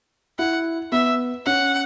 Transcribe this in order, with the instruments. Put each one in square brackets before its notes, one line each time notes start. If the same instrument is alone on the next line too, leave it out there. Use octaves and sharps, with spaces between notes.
[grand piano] E4 [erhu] F#5
[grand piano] B3 [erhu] E5
[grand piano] C#4 [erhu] F#5